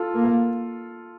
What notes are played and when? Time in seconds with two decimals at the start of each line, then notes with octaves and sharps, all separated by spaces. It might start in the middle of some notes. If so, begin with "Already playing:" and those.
Already playing: F4 A4
0.15 A#3